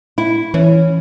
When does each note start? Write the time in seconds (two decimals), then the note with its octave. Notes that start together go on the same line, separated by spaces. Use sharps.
0.18 E4
0.54 E3 C#4